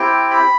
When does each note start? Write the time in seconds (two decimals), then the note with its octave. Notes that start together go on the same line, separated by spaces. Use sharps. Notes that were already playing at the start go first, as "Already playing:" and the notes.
Already playing: C4 E4 G4 G5
0.31 B5